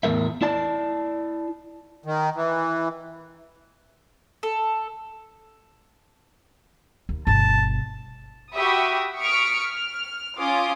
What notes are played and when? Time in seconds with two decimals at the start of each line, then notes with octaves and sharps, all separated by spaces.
0.03 E2 A2 G#3 A#4 E5
0.42 E4 D5 A5
2.06 D#3
2.35 E3
4.43 A4
7.09 D#2
7.27 G1 B2 A5
8.55 F#4 G4 E5 B5 C#6 D#6
9.20 C#6 D#6 F6 B6 C#7 D7
9.63 F6
10.40 C#4 F4 C6 D6 D#6